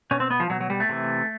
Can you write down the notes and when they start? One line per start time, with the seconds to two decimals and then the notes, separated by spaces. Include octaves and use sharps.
0.11 B2 C#4
0.20 C4
0.30 B3
0.40 F3
0.50 B2 F#3
0.61 F#3
0.70 G3
0.80 A3
0.89 C3 E3